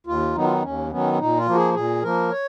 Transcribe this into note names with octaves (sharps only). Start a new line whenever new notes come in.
D#2 F4
D#3 F#3 B3 D#4
F4
D#4
D#2 C#4
D#3 F#3 B3 C#4
C#4
A#2 D#4
F4
F3 A#3 F#4
G#4
A#2 G#4
F3 A#3 A#4
C#5